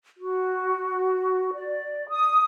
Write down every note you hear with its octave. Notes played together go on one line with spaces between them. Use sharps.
F#4
D5
D#6